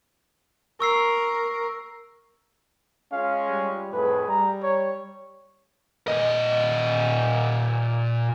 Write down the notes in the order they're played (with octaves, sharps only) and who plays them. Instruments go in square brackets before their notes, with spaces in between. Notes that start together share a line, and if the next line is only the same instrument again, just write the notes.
[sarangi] A#4 [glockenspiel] C#6 E6 C7
[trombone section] G#3 C#4 F4 [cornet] F5
[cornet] G3
[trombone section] F2 A2 G#4 [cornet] B4
[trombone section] G3 [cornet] A#5
[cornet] C#5
[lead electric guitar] A#2 D#5